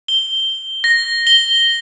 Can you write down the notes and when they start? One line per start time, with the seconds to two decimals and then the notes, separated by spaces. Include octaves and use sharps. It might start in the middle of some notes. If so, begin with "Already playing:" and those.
0.08 G7
0.84 A#6
1.27 G7